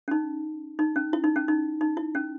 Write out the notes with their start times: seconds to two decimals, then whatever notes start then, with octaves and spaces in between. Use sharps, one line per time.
0.08 C#4
0.11 D#4
0.79 D#4
0.96 C#4
1.13 E4
1.24 D#4
1.36 C#4
1.48 D#4
1.81 D#4
1.97 E4
2.15 C#4